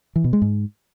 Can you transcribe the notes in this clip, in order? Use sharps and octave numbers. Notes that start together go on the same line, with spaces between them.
E3
B2
G#3
G#2